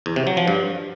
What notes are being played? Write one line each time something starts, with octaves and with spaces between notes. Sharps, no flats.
E2
C3
F#3
F3
G2